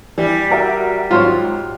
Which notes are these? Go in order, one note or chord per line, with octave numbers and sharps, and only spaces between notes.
E3 G3
F#4 A#4 E5
G#2 F#3 F4 C5 C#5